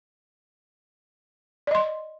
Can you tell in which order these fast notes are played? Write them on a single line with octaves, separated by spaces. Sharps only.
D5 D#5 C6